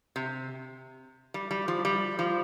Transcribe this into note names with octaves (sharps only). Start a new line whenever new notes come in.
C3
G3
G3
F3
G3
F3